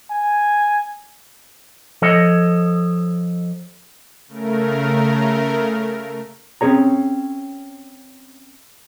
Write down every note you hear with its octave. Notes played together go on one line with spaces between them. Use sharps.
G#5
F3 A4 C#5 D#5
C#3 A3 A#4
C4 C#4 G#4 C#5 A#5